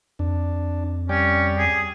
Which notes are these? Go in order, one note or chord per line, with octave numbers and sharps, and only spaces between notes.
F2 D4
G3 C#4 D5 G5
G#4